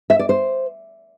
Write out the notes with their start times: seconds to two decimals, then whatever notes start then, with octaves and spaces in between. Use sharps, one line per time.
0.10 E5
0.19 D5
0.29 C5